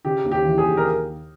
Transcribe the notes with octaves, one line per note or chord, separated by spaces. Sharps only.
C#3 G4
D#2
G4
E3
G#4
D#2
A#4